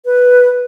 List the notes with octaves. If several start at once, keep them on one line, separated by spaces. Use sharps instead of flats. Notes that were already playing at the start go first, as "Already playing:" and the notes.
B4